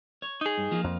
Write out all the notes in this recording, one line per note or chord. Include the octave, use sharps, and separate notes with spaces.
C#5
D#4 G#4
G2
F3 A#3 F4
F2